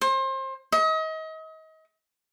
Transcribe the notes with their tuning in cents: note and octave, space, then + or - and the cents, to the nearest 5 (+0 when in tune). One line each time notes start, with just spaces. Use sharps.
C5 +30
D#5 +35